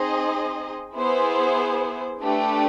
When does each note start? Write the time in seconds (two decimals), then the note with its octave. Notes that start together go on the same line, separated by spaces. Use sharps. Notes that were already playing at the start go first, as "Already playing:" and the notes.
Already playing: C4 D#4 G#4 C5 D#5
0.95 B3 E4 G#4 C5
2.22 A3 D4 G4 B4